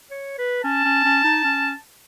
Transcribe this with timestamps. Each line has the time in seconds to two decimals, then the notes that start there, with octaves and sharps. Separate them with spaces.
0.11 C#5
0.38 B4
0.64 C#4 A5
0.85 C#4
1.04 C#4
1.24 D#4
1.44 C#4